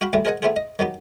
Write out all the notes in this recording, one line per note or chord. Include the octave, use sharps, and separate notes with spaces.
F#4 F5 G5 B5 C6
D2 A2 E3 G3 A3
G#4 A#4 C5 D#5 F#5 G#5
A3 B3 C4 E4 F4 G#4
D#5
D#3 F#3 B3 G4